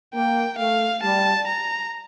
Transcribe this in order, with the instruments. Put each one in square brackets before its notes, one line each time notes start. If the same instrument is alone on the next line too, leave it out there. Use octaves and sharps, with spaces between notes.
[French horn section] A#3 [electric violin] G5
[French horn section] A3 [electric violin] F5
[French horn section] G3 [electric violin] A5
[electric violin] A#5